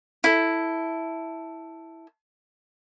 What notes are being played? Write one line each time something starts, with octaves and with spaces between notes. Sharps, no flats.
E4 A4